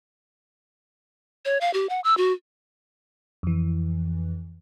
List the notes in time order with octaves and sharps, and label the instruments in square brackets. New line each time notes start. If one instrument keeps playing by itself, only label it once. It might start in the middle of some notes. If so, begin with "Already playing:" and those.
[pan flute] C#5
F5
G4
F#5
E6
F#4
[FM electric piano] F2 E3